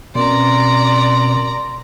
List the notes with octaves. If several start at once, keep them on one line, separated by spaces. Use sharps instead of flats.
B2 C4 C#4 A#4 D5 A#5 C6